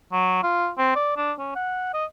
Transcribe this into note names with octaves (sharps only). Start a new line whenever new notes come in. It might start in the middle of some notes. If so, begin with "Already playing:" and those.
F#3
F4
C4
D5
D4
C#4
F#5
D#5